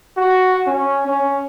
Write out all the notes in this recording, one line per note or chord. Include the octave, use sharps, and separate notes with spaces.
F#4
C#4
C#4